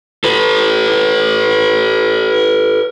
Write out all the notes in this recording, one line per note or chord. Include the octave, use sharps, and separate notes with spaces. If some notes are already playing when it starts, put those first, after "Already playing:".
A4 B4